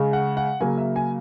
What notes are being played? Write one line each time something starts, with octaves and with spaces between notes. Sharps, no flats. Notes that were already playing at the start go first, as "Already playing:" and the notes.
Already playing: C#3 G#3
F#5
F#5
C#3 F#3 A#3 G#5
E5
G#5